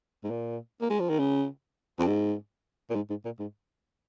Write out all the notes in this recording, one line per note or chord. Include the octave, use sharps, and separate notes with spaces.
G#2
A#2
A#3
G#3
F3
D#3
C#3
F2
G#2
A#2
G#2
G#2
A#2
G#2